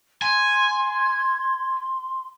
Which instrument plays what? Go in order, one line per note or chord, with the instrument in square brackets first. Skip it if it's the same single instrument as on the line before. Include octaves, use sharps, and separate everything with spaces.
[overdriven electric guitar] G#5 [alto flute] C6